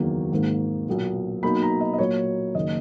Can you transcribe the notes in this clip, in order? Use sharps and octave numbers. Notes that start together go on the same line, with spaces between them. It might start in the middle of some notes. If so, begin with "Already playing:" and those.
Already playing: F#1 E2 D#3 F#3 A#3
G#1 G#2 D#3 A#3
B1 A#2 A#3
B1 B2 A#3 D#4 B5
A#5
D#5
D#5
A#2 F#3 A#3 C#5
F#1 D#3 A#3 D#5